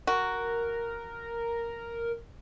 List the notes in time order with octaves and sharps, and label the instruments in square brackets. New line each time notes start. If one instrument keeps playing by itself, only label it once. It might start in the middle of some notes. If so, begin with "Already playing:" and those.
[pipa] F#4 [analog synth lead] A#4